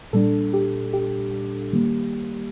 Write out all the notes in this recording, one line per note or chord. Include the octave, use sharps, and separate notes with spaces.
A#2 G3 D4 A4
G4
G4
D#3 G3 A#3